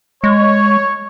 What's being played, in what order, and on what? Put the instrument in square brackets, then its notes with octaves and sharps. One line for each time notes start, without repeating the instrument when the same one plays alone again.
[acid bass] G#3 [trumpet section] C#5